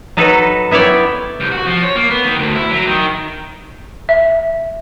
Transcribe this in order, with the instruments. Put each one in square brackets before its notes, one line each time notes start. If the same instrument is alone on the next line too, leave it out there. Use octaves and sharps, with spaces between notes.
[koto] F#3 D#4 A4 B4
B3 E4 C#5 D5 G5
[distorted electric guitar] C2
F#4
F3
C#5
A#3
B3
D#3
D2
E4
F#3
D#3
[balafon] E5